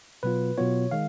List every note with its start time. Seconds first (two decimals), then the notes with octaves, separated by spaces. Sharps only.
0.23 B2 F#3 B3 F4 B4
0.58 B2 F#3 B3 F4 C#5
0.91 D#3 G#3 F5